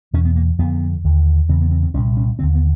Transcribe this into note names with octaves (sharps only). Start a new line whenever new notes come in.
E2 B2 C#4
B3
A#3
F2 D3 B3
D#2 D3
E2 C#3 C4
B3
C4
C4
C2 A#2 C#4
C#4
D#2 D3 C4
B3